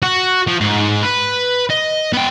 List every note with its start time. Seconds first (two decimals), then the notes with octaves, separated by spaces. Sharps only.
0.03 F#4
0.47 F3
0.61 G#2 G#4
1.03 B4
1.70 D#5
2.13 B3 G5